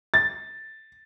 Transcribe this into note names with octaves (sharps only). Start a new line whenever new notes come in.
A6